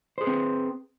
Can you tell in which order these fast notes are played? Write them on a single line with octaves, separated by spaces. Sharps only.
C5 G#4 B4 C4